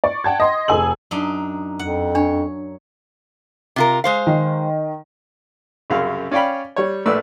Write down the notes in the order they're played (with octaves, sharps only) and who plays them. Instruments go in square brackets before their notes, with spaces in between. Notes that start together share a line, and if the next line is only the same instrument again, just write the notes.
[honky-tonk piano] D5 C#6
F#5 G5 A5 G#6
D#5 C6
F1 G#4 A4 G#5 E6 F#7
[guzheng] F#2 D4 D#4
[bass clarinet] F2 [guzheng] F#5
[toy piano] D4 [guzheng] C#5
[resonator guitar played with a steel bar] C3 F4 A#4
G#3 C5 F5
[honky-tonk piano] D#3
[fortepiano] C2 F#2 C#3 F5
C#4 D5 F5 G5 B5
G3 C#5
A#1 A2 B4 D5 E6